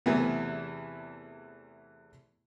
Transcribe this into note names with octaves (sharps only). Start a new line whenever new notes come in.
E2 C3 E3 F#3 A3 B3